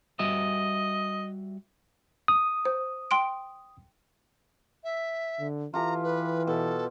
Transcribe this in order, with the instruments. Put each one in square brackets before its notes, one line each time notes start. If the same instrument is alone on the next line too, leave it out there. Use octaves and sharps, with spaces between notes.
[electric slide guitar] G3 F#4 E5 [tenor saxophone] D#5
[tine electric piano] D#6
[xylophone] C5
G5 C6 D7
[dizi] E5
[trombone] D3
[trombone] E3 [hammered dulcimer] F4 G4 A4 [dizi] A#5
[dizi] B4
[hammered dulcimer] B2 [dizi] A4